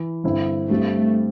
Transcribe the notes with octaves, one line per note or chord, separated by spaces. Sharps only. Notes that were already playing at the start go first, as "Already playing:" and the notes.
Already playing: E3
G2 D3 C4 E4
G2 G3 A3 C4